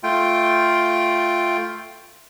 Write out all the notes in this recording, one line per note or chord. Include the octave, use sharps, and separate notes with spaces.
A3 F4 G5